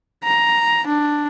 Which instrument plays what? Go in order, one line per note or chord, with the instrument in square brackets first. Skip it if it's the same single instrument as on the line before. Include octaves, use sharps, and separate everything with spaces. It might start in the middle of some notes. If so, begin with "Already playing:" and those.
[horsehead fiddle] A#5
D4